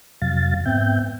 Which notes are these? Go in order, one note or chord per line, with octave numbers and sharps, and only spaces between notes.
F2 C3 F#3 F5 A6
G#2 B3 C4 E5 G5 G6